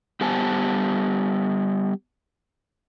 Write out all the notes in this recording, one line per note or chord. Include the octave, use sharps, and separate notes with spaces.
G3 B3 G4 C5 G#5 A5